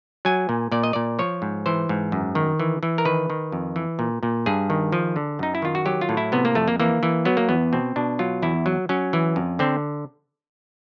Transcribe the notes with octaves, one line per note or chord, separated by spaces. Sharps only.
F#3 G#5
A#2
A#2 D5
D#5
A#2 D5
F3 C#5
G#2
E3 C5
G#2
F#2
D#3
E3
E3
A#4
D#3 B4
D#3
F2
E3
A#2
A#2
G2 G#4
D#3
F3
D3
F#2 D#4
E4
D#3 F4
F#4
F#3 G4
F4
A2
E4
C3 B3
A#3
F2 A3
A#3
E3 A#3
E3
F#3 B3
A#3
E2 B3
B2 C4
B2 D4
F#3 F4
E2 E4
F#3
F#3 C#4
E3
F2
D3 C4